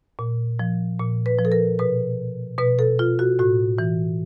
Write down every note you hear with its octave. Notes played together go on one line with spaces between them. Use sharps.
A#2
F3
A#2
B4
F3
A4
A#4
B2 B4
B2 B4
A4
F4
F#4
A2 F#4
E3